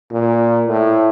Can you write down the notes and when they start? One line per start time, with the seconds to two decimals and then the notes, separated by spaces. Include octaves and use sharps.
0.12 A#2
0.67 A2